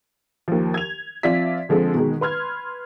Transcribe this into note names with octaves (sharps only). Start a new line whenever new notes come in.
D#2 F3
G#6 F7
F3 C4 F4 D5 E5 B6
D3 F3 G#3 C4 A4
B2 D#3 G#3
B4 C6 F6 G#6